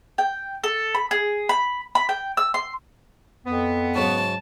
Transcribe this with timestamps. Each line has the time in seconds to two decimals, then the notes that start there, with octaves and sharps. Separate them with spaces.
0.18 G5
0.64 A4
0.95 B5
1.11 G#4
1.49 B5
1.95 B5
2.09 G5
2.37 E6
2.54 C6
3.47 F2 B3
3.95 G#2 C#3 F#3 A5